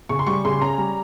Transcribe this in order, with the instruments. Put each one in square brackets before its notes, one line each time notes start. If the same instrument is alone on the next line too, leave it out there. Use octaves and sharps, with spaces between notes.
[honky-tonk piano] C#3 C#6
C6
G3 C#6
C#3 C6
C#4 A#5
G3